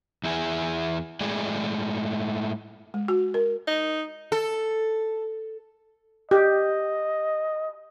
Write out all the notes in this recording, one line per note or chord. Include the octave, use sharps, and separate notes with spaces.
E2 E4 G#4
A2 G#3 A3 G#4 D5
G#3
F#4
A#4
D#4
A4
G4 D#5